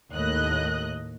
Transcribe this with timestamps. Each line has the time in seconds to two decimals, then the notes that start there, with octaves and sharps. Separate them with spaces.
0.14 D#2 A2 D#5 F#6